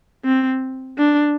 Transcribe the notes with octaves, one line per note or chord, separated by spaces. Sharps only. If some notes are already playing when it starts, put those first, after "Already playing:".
C4
D4